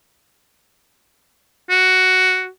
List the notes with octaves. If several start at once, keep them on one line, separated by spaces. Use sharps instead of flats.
F#4